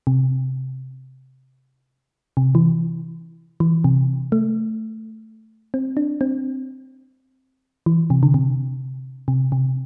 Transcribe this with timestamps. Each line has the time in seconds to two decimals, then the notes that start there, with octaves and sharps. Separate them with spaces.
0.07 C3
2.37 C3
2.55 E3
3.60 E3
3.84 C3
4.32 A3
5.74 C4
5.97 D4
6.21 C4
7.86 E3
8.10 C3
8.23 D3
8.34 C3
9.28 C3
9.52 C3